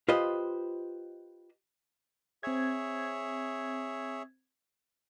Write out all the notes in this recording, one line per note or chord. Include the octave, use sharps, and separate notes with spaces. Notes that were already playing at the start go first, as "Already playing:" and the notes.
F4 G4 B4 C5 D#5
C4 G#4 C#5 E5 G#6